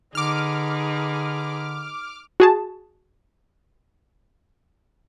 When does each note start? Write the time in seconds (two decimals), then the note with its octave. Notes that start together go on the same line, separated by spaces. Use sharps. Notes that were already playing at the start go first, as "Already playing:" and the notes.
0.15 D3 D#4 G#4 B4 D6 F6
2.40 F#4 G#4 A5